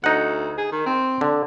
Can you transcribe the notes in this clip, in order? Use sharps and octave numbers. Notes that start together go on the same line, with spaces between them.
D2 D#4 F#5
G#4
D#3
C4
D3